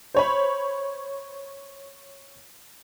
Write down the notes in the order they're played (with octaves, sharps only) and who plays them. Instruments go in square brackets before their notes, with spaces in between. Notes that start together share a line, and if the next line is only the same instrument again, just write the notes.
[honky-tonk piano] C5 C#5 B5